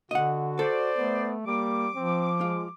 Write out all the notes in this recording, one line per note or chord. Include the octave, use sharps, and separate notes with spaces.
D3 F#4 D#5 F#5
A4 C5 D5
A3 B3
G3 A#3 D6
F3 C4
G#3 F4